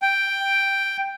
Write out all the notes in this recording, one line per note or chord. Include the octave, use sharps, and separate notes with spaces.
G5